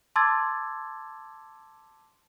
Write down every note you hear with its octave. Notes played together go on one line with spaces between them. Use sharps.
A5 C6 D6 E6 G#6 A6